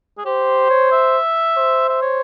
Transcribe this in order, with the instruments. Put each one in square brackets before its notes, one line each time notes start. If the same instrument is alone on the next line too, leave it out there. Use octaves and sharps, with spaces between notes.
[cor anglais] G#4
[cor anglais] G4 [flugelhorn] C5
[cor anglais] C#5
E5
[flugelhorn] C5
[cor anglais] E5
C#5